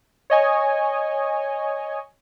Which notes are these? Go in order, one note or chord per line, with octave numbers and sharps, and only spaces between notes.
C#5 D#5 G#5